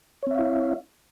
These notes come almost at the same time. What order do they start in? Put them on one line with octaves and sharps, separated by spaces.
C#5 C4 E5 F5 E4